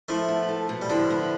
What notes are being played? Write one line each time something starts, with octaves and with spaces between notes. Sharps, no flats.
F3 A3 E4
B3
A4
B2
G3
D3 F3 E4
B3